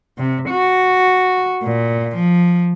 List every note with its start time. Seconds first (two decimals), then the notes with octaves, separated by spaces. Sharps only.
0.18 C3
0.50 F#4
1.64 A#2
2.16 F3